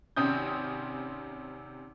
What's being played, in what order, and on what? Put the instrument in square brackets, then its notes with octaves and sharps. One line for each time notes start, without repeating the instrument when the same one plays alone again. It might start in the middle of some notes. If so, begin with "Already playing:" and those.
[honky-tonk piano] G#1 C3 C4 C#4 D#6 G6